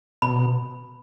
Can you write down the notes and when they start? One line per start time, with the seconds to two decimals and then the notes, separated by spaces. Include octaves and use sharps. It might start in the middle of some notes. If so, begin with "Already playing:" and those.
0.22 B2 B5